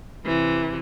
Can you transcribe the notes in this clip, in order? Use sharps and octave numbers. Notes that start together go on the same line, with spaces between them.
C3 E3